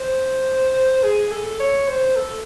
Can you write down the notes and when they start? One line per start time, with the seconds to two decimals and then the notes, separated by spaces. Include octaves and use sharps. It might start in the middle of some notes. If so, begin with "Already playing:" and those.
Already playing: C5
1.03 G#4
1.31 A4
1.60 C#5
1.88 C5
2.16 A4